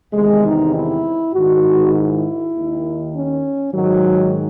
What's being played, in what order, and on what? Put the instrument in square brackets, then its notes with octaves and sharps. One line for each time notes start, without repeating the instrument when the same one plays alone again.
[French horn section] E2 C3 D#3 G#3
D#4
E4
G#2 D#3 F#4
E4
D#2
D#3
C#4
G#2 D#3 F#3